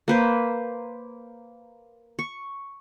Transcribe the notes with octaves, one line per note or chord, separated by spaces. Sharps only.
A#3 B4 C5
C#6